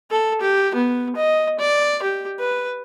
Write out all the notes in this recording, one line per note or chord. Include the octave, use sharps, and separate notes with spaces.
A4
G4
B3
D#5
D5
G4
B4